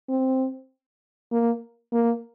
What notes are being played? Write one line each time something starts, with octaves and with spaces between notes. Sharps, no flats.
C4
A#3
A#3